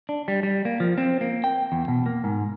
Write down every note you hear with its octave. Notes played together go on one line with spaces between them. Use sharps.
D4
G3
G3
A#3
F3
C4
A#3
G5
E2
B2
A#3
G#2